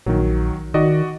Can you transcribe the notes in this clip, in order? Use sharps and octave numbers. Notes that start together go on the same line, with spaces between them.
A#1 D#3 F#3
D#3 F#4 D5 D#5